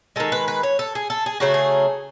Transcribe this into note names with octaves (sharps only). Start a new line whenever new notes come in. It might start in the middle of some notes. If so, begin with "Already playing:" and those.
D#3 G#3 A4
B4
B4
C#5
A4
G#4
A4
G#4
C#3 F#3 A3 F#4
G#4